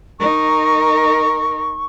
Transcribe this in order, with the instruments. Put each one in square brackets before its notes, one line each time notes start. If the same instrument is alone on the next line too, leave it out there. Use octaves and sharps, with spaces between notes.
[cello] D#4 A#4 [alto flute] C#6